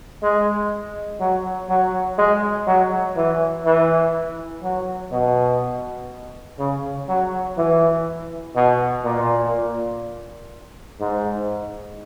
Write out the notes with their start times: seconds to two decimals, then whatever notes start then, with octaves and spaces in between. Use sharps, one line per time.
0.22 G#3
1.20 F#3
1.69 F#3
2.18 G#3
2.67 F#3
3.16 E3
3.65 E3
4.63 F#3
5.12 B2
6.59 C#3
7.08 F#3
7.57 E3
8.55 B2
9.04 A#2
11.00 G#2